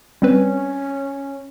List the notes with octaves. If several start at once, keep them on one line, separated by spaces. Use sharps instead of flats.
G3 C4 C#4 B4